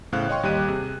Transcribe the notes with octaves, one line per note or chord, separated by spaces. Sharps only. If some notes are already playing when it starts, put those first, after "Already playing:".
E2 A2 C#3 C5 F5 F#6
C#5 D#5 F5 G5 C6 C#6
D#2 G3 G4 D#5 F#6 D#7
C3 G#4